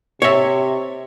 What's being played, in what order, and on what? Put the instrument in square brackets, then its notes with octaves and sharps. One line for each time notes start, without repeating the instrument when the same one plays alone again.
[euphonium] C3 [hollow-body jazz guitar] C#5 E5